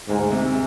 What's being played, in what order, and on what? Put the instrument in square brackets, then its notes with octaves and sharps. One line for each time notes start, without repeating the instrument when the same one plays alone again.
[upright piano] D2 [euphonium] G#2
[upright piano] C3